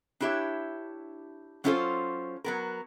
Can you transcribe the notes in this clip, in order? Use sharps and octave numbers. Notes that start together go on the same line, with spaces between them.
D4 E4 G4 C#5 E5
F#3 C#4 D4 F4 A4 C5
F#3 B3 A#4